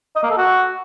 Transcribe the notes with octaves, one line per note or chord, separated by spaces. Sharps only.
D#5
A#3
A4
F#4